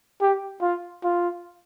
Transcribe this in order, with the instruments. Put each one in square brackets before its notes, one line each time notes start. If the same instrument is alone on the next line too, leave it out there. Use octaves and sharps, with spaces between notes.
[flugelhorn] G4
F4
F4